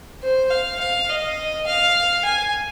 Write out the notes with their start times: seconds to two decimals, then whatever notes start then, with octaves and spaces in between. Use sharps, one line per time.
0.23 C5
0.51 F5
0.80 F5
1.09 D#5
1.67 F5
2.25 G#5